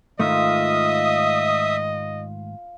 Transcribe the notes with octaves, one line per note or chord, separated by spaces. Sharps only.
G#2 D#3 A3 F4 D#5 E5 D#6